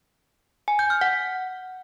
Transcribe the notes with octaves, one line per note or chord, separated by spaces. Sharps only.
G#5
G6
F6
F#5